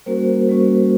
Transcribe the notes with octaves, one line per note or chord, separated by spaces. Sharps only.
G3 A#3 C#4 F#4 A#4 C5
G3 A#3 C#4 F#4